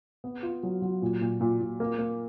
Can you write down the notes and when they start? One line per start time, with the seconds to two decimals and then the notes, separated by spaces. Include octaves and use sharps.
0.24 B3
0.43 F4
0.63 F#3
0.82 F#3
1.02 A#2
1.21 A#2
1.41 A#2
1.61 A#2
1.80 A#3
1.99 A#3